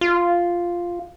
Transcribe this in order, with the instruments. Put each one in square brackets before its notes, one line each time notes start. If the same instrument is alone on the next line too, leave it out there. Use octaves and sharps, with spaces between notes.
[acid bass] F4